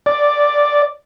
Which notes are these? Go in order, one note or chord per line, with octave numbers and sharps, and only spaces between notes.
D5